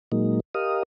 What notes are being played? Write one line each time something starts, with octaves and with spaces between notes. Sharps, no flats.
A#2 F#3 G#3 A#3 D#4
G4 A#4 D#5 F5 D#6